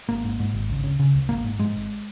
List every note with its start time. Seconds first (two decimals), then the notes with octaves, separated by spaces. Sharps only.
0.09 G#1 A#3
0.24 G#2
0.39 G#2
0.54 G#1
0.70 C#2
0.84 C#3
0.99 C#3
1.14 C#2
1.29 G#1 A#3
1.44 G#2
1.59 G#2 G#3
1.75 G#1